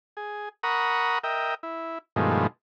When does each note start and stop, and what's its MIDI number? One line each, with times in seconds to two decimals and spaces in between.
0.17 0.49 68
0.63 1.18 70
0.63 1.18 78
0.63 1.18 82
0.63 1.18 83
0.63 1.18 85
0.63 1.18 87
1.24 1.55 70
1.24 1.55 75
1.24 1.55 76
1.24 1.55 79
1.63 1.98 64
2.16 2.47 43
2.16 2.47 47
2.16 2.47 51
2.16 2.47 53
2.16 2.47 56
2.16 2.47 57